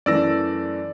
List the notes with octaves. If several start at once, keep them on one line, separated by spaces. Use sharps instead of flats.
F#2 E3 A3 D5 E6 A#6